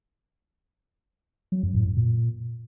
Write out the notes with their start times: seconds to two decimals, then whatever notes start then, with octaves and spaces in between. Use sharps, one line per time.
1.52 F#3
1.63 F#2
1.74 A2
1.85 F#2
1.97 A#2